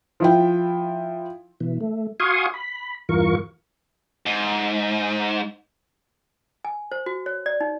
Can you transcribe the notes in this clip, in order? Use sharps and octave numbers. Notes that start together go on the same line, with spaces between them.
F3 E4 G5
B2 E3
A3
F#4 F5 G#5 C6 C#6 D#6
B5
E2 G2 E3 F4 A#4 C#6
G#2
G#5
C5
F#4
C#5
D5
D#4